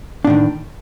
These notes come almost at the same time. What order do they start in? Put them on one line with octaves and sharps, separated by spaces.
D4 A2 D#3